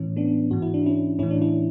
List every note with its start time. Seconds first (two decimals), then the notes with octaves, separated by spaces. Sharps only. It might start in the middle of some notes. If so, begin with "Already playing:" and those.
Already playing: A2 E3 C#4
0.16 B3 D4
0.51 G#2 E3 F#4
0.62 E4
0.74 D4
0.86 C#4 E4
1.19 A2 E3 C#4 E4
1.31 D4
1.41 C#4 E4